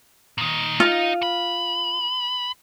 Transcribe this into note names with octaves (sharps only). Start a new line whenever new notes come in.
A#2 D#3
D#4 F4
B5